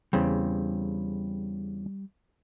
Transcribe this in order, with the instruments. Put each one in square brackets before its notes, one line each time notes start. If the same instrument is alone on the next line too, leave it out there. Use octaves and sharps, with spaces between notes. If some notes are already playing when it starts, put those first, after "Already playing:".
[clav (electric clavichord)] E2 C#3 C4 [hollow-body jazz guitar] G3